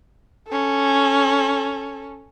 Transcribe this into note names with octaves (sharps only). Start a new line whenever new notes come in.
C#4 A4